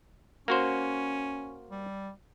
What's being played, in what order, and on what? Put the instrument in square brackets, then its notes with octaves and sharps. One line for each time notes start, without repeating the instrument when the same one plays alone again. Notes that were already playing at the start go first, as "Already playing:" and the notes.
[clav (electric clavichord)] A#3 F#4 C5 [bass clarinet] C#4
[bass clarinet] G3